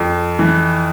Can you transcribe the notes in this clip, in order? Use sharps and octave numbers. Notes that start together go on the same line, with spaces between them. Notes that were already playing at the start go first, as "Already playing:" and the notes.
Already playing: F2
E3